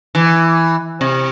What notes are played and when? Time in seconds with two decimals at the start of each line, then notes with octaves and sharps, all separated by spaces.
0.15 E3
1.01 C3